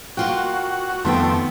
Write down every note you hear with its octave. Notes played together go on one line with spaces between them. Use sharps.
A#3 F4 F#4 G5
F2 D#3 A3 B3 C4 G5